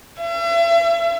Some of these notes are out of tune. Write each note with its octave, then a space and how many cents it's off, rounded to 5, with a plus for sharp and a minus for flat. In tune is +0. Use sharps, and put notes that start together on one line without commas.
E5 +40